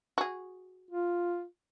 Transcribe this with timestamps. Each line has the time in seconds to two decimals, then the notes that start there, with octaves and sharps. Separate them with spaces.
0.18 F#4 G#4
0.91 F4